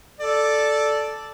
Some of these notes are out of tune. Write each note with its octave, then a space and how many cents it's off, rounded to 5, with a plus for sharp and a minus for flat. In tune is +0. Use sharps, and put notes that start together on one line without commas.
A4 -5 D5 +0